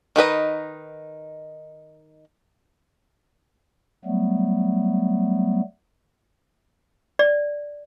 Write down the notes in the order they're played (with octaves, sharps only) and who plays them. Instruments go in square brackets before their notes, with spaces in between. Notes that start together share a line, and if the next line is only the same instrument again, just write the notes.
[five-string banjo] D#3 D#4 B4 D#5
[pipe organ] F#3 G3 A3 B3
[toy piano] D5